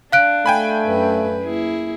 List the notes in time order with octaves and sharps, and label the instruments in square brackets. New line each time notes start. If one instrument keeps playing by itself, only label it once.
[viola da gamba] D4 [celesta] F5 F#6 D7
[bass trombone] A3 [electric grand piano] G5 G#5 B5
[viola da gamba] F#2 B4
A#3 E4 G#4